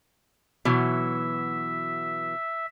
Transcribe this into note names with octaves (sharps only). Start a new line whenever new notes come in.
B2 E3 F#3 E5